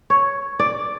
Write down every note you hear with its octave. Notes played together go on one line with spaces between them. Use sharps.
C#5
D5